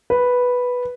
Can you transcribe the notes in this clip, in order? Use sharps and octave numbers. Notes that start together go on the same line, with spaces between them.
B4